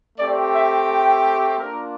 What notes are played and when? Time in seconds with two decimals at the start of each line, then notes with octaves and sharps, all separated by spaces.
0.19 A3 C4 G4 D5
0.54 E5
0.89 G5
1.59 A#3 D4 F4 A#4